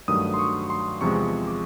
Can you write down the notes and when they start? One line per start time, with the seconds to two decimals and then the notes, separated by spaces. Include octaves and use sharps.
0.08 G2 D#3 F#3 A3 D#6
0.34 C6
0.39 C#6
0.70 C6
1.01 E2 C3 F3 G#3 C#6
1.47 D6